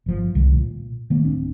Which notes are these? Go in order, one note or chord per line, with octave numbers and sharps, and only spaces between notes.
G1 F3
C2 D3 D#3 A3
A#2
D#3 A3 A#3
D1 C4 D4